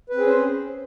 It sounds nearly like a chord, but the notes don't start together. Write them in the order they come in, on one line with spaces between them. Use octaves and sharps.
B4 C4 G#4 C#4 C5